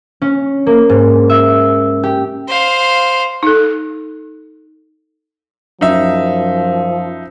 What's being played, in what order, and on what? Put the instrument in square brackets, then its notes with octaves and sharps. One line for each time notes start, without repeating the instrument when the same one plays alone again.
[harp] C#4
A#3
G#2
E5
G4
[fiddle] C5 F5
[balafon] D#4 A4
[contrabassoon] F#2 [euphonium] F3 [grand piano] D#4 E5